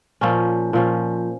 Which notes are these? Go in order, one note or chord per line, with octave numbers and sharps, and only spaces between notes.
A#2 F3 C#4
A#2 F3 C#4